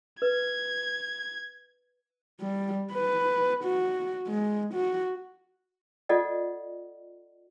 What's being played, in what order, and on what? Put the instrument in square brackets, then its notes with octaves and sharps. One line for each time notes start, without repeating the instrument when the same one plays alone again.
[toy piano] B4 [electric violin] G#6
[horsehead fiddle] G3
B4
F#4
G#3
F#4
[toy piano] F4 A4 D5 D#5 F#5